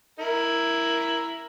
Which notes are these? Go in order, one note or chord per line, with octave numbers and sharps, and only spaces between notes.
E4 A#4